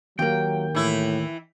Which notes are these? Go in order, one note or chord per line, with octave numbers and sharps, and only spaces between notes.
D#2 F#3 A#3 G5
A2 E3 E4